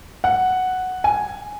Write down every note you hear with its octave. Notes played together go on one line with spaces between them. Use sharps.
F#5
G#5